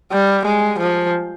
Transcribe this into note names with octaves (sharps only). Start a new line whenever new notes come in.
G3
G#3
F3